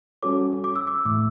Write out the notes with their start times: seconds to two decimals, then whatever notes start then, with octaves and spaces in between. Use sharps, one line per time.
0.23 G3 C#4 F#4 A4 C#5 D6
0.64 D6
0.76 E6
0.87 D6
1.05 A2 E3 A3 D6